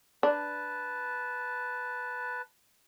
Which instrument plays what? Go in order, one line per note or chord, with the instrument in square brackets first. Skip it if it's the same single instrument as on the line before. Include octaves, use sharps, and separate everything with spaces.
[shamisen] D4 [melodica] B4 A5